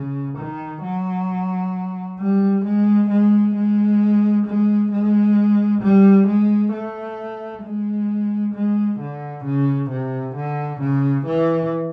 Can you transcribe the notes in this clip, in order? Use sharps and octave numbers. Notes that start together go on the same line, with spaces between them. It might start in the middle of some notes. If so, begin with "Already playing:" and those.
Already playing: C#3
D#3
F#3
G3
G#3
G#3
G#3
G#3
G#3
G3
G#3
A3
G#3
G#3
D3
C#3
C3
D3
C#3
E3